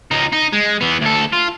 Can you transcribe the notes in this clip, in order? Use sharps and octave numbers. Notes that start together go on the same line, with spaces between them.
C#2 D#4
D#4
G#3
E3 B3
D2 A4
F4